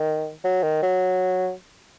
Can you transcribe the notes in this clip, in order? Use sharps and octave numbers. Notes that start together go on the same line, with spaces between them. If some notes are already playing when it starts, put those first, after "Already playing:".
Already playing: D#3
F#3
D#3
F#3